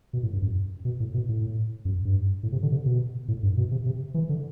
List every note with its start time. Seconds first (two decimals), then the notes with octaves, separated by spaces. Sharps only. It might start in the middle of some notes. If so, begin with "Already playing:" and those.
0.13 B2
0.23 A2
0.33 G2
0.42 F#2
0.85 B2
1.00 A2
1.14 B2
1.29 A2
1.85 F#2
2.05 G2
2.43 A2
2.52 C3
2.63 D3
2.71 C3
2.86 B2
3.28 A2
3.43 G2
3.57 B2
3.71 C3
3.86 C3
4.14 E3
4.29 D3